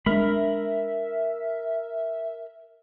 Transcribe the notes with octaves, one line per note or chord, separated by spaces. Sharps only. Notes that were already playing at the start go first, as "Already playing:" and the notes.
G#3 A#3 D4 A#4 E5 B5